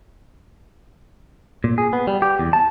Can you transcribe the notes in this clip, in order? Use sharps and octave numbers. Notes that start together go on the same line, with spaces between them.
A#2
G#4
B3
G3
G4
E2
A5